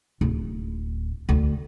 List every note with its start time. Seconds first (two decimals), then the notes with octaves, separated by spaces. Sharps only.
0.21 D1
1.29 D2